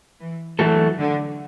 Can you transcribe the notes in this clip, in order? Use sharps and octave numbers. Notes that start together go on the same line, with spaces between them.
E3
E3 F#3 A3 F#4 A4
D3